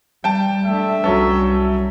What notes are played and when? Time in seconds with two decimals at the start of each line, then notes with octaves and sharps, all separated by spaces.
0.24 G3 G5 A5
0.65 A3 D4 E5
1.04 C2 F#3 G3 C#4 A4